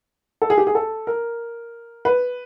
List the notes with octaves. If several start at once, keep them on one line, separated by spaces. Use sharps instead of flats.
A4
G#4
G4
G#4
A4
A#4
B4